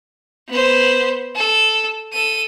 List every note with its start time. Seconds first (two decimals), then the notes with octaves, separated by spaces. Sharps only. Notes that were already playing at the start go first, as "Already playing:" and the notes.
0.48 B3 C5
1.35 A4
2.13 A4 D#7